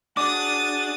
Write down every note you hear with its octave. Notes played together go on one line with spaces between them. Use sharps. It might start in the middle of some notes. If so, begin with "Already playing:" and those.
D4 F#4 G#4 F#5 D6 D#6 A6